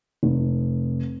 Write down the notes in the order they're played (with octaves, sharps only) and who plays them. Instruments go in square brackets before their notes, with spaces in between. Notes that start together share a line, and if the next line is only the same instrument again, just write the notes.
[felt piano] F1